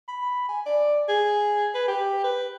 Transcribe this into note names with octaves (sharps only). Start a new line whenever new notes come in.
B5
G#5
D5
G#4
B4
G4
B4